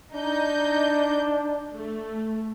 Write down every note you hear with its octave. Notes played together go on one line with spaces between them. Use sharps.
D4 D#4 G6
A3